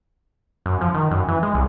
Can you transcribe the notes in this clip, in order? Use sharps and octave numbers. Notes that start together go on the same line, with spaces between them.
F#2
F3
D#3
F#2
E3
G#3
C2